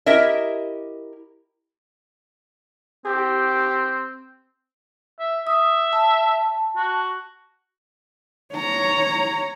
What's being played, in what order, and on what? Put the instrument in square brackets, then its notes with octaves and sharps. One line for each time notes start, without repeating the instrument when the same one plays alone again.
[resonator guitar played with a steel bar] E4 G4 A#4 D#5 E5
[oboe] C4 [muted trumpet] G4
[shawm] E5
[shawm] E5 [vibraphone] D#6
[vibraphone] A5
[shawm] F#4
[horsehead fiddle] C#5 A#5